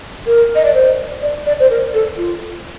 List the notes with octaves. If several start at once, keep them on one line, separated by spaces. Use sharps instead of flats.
A#4
D#5
D5
C5
D5
D5
C5
A#4
A4
F4